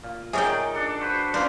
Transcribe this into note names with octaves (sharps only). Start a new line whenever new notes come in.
A#2
D#4 G#4 A#4 C#5 D5 E5 G5 G#5
D4 A4
F#4 B4 C5
A#2 F3 C#4 A#4 C5 D5 D6